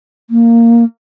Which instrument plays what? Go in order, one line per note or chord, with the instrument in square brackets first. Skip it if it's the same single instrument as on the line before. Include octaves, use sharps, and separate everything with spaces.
[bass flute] A#3